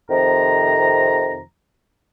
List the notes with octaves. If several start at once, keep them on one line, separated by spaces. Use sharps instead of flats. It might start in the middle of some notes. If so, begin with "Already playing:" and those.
F2 C3 D#3 F3 A#5